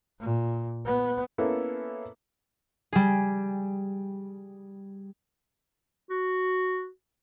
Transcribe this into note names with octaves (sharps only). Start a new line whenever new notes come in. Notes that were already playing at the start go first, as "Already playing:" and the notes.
A#2
B3
A#3 B3 C#4 E4 A4
G3 G#4
F#4